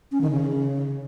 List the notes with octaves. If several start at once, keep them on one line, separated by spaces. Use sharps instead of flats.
C#4
D#3
C#3